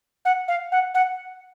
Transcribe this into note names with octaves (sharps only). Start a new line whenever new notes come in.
F#5
F5
F#5
F#5